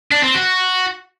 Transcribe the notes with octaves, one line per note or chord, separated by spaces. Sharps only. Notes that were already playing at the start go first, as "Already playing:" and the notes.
D4
C4
F#4